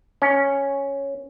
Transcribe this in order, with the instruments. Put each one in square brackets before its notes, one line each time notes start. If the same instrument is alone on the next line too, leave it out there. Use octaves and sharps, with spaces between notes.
[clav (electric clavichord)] C#4